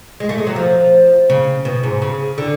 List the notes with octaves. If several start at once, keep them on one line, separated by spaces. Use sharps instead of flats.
G#3
A3
G#3
F#3
F3
C#3
B2
G#2
C#3
D3